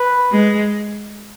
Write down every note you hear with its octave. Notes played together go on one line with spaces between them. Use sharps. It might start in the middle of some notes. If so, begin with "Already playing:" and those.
Already playing: B4
G#3